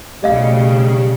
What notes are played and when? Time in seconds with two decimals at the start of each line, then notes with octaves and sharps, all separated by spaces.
0.24 B1 C#3 G3 A3 D#5 F5